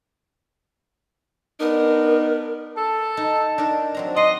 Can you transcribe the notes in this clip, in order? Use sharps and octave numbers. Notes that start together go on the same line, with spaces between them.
B3 D4 D#4 A#4
A4 A5
D#4
D4 D#4 A#4
F#3 C4 A#5
D5 D#5 F#5 C6